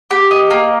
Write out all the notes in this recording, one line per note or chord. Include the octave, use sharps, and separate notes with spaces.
G4
D#5
A#3